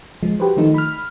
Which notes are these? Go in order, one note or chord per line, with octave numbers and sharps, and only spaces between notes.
F3 G#3
F#4 G4 B4 C5
D#3 F3 A3 D#4
B5 F6